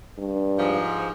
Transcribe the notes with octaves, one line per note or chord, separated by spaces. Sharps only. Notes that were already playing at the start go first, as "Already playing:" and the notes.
G2
G#2 F3